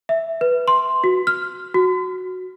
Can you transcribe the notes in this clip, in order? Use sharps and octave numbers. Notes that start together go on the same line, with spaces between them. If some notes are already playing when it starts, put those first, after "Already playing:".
E5
B4
C6
F#4
F6
F#4